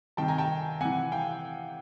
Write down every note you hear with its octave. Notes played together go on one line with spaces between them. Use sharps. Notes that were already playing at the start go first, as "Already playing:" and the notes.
C3 D#3 G5 A5
G#5 A#5
G5 A5
C3 E3 F#5 G#5
F5 G5